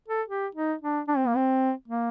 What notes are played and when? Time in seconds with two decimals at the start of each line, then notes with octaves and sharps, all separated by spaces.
0.08 A4
0.28 G4
0.55 D#4
0.81 D4
1.08 D4
1.17 C4
1.27 A#3
1.36 C4
1.88 A#3